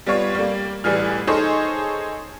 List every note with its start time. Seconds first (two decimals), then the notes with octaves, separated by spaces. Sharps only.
0.06 G3 B3 F4 C#5 F5
0.34 G3 A#3
0.84 A1 E3 G3 G#4 F6
1.27 D#4 G#4 A4 C5 C#5 D#5